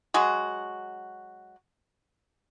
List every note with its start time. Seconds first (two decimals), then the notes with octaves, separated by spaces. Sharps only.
0.14 F#3 G#3 F#4